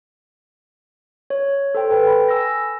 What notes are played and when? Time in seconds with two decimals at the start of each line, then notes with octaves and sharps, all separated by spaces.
1.30 C#5
1.75 A4 C5 G5
1.90 A4 B4 G5
2.07 B5
2.29 G#5 E6 A#6